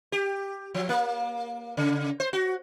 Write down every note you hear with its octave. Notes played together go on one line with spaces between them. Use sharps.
G4
F3
A#3
C#3
C5
F#4